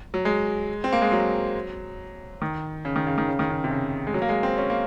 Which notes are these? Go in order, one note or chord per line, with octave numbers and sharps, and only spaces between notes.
F#3
G#3
C4
A#3
G#3
F#3
D#3
C#3
D#3
C#3
D#3
C#3
D#3
C#3
C3
C#3
G#3
F#3
A#3
G#3
C4
C#4
A#3